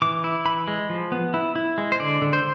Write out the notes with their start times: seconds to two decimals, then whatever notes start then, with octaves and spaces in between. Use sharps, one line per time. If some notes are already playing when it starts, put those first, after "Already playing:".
0.02 E3 D6
0.24 E4
0.45 E3 B5
0.68 G#3
0.90 F3
1.12 B3
1.34 E4
1.56 E4
1.78 G#3
1.92 C5
2.00 D3 D5
2.22 D3
2.33 C5